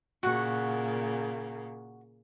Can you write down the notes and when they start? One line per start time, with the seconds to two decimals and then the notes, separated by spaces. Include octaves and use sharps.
0.23 A#2 C#3 A#3 F#4 F#5 C#6